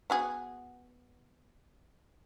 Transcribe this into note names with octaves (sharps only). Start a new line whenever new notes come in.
B3 F#4 G#4